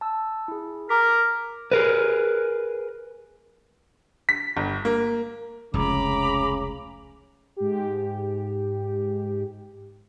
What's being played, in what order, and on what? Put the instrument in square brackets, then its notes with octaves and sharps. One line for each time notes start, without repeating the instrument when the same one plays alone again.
[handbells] A5 E6
E4 G#4
[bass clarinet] A#4 [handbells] A#5 D6 B6
[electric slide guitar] G#4 A#4 B4
[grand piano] B6
G1
A#3
[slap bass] F1 C#2 [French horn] C#3 [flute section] A#5 B5 D6
[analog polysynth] G#2 G4